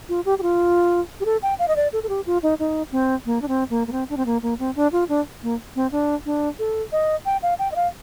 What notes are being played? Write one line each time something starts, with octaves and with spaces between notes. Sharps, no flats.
F4
G4
G4
F4
G4
A4
G5
F5
D#5
D5
A4
A4
G4
F4
D#4
D#4
C4
A#3
D4
C4
A#3
A#3
C4
D4
C4
A#3
A#3
C4
D4
F4
D4
A#3
C4
D4
D4
A4
D#5
G5
F5
G5
D#5
F5